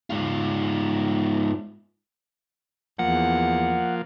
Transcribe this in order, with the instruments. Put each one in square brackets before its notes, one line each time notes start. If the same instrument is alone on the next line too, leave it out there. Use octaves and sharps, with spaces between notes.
[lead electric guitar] G#2 F4
[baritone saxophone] E2 [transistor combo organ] F3 A#3 [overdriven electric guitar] F#5